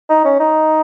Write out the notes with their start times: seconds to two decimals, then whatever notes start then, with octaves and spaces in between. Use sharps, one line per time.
0.10 D#4
0.25 C#4
0.40 D#4